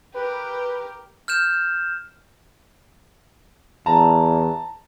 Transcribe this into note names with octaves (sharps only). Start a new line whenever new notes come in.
G4 A#4 B4
F6 G6 E7
E2 A5 A#5